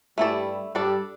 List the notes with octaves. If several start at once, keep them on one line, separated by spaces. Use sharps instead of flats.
G2 G3 A3 E4 A4 D5
G2 G3 D4 A4 D5